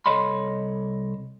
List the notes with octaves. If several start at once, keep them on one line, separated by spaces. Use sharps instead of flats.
C2 A4 C#5 D#5 B5 C6